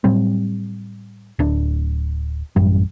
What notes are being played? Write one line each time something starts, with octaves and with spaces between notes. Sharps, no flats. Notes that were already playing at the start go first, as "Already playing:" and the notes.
A2 F#3 G3 C4
D1 D4
A1 F#2 G3